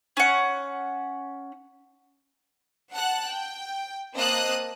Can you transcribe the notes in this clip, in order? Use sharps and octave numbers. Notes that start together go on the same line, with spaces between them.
C#4 F#5
F#5 A5 F#6
G5
A#3 C4 D#5 A5 D#6 F#6